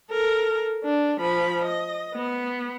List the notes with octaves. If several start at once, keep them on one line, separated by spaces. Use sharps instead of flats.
A4 A#4
D4
F3 B5
D#5
B3